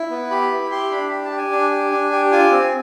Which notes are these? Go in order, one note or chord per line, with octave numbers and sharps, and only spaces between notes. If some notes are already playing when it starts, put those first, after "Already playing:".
Already playing: E4
B3
G4 B5
E4
G4 C6
D4 B5
G4
A5
G4
G#5
D4
G4
D4
G4
F4 G#5
C4